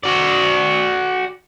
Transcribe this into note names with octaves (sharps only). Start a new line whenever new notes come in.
F#4 D5